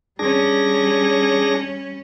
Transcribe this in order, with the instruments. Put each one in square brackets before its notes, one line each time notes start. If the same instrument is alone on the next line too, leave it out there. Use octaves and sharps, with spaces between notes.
[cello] G3 C#4 [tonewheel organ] D4 G#4 A#6